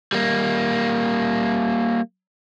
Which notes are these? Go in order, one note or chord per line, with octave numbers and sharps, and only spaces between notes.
G3 A#3